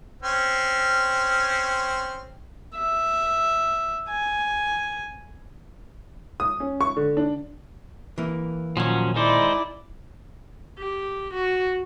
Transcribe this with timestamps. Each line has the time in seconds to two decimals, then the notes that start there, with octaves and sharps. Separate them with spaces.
0.22 C4 C#4
2.75 E5
4.09 G#5
6.40 D#6
6.60 C#4
6.81 C#6
6.97 D3
7.17 D4
8.18 E3 A#3
8.77 A#2 D#3 F3 F#3 C#4
9.16 G#3 D#4 E4 C5 D5
10.79 G4
11.34 F#4